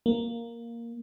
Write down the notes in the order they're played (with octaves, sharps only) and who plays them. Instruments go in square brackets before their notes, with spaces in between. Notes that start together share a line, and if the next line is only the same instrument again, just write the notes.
[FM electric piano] A#3